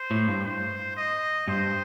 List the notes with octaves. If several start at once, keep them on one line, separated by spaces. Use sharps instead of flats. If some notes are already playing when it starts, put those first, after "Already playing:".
Already playing: C5
A2
G2
C5
D#5
G2 C5